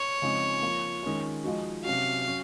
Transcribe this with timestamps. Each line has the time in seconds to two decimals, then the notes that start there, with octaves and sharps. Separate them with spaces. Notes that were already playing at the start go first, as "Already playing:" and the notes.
Already playing: C#5
0.22 C#3 F3 G#3 C4 D#4
0.62 F3 A#3 F4
1.03 D#3 G#3 C#4 F4
1.44 F3 G#3 D#4 F#4
1.84 C3 F#3 C#4 F#4 F5
2.26 F#3 C#4 F#4